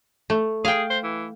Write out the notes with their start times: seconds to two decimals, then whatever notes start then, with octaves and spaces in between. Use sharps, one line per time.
0.30 A3
0.65 G#4 F5 G5
0.90 C5
1.04 E3